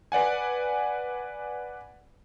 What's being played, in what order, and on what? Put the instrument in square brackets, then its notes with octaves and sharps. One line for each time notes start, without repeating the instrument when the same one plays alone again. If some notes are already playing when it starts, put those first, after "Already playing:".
[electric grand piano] B4 D5 F#5 G#5